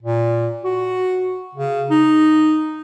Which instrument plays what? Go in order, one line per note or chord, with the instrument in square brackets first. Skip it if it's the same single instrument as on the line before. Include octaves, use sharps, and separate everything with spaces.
[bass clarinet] A#2
F#4
C#3
D#4